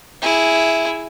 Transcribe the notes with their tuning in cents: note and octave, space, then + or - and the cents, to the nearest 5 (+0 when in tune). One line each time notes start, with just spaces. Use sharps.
E4 +0 G#4 +0